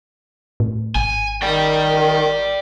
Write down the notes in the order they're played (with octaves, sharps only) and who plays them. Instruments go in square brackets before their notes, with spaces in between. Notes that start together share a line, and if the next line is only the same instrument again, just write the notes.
[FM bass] A2
[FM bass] G#1 [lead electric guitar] G#5
[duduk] D#3 [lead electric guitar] D5 G5